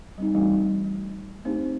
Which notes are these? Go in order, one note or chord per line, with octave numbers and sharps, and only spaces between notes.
G3 C4 D#4
E3 G3 A3 D4 D#4 F#4
A3 C4 D4 D#4 G4 C5